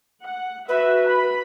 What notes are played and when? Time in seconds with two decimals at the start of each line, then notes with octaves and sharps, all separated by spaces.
0.23 F#5
0.68 F#4 B4 E5
1.08 B5